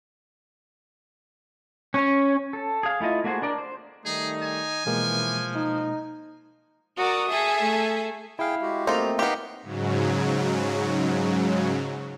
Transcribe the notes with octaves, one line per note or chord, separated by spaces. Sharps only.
C#4
A4
G#4 F5
A3 E4 F4 D#5
A3 A#3 F#4 G#4 C5
D4 A#4 D5
C5
D#3 G3 A3 D#4 G#4
G#5
B2 E3 F3 G#3 A#3
D#4
F#4 A#4 D5 D#6
G#4 A4 E5
A3
E4 G#4 F5 G5
G#3 F#4 G4
A3 A#3 C4 D#4 F4
B3 D#4 G4 A#4 F5
G#2 C#3 F#3